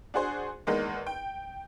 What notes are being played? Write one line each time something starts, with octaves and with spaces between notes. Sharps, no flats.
D4 F#4 G#4 C5
E2 D#3 G#3 A#3
G5